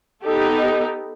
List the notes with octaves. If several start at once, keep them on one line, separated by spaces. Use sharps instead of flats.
B3 D#4 G4 A4